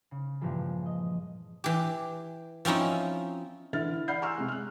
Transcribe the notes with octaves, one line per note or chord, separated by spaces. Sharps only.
C#3
G2 A#2 E3 F3 G#3
D#5
E3 G4
F3 C4 C#4 D#4 E4
D3 E3 E4 E5 F6 A6
E4
D5 F#5 B5 F6 G6 C7
G#5 A#5 C6 C#6 E6 F6
C3 G#3 F#6
F6 F#6